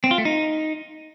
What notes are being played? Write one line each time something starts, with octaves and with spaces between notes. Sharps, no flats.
C4
F4
A3
D#4